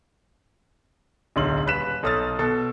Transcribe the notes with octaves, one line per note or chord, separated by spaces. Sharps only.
D1 B1 D3 C6 F#7
D#1 B4 F#6 B6 E7
B1 A4 D#6 F6 A6
B2 A4 E6